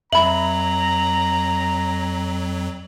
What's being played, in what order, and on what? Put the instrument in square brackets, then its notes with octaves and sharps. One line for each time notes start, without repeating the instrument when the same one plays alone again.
[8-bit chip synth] F2 F#3 [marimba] E5 B5 [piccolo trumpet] A#5 [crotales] F#7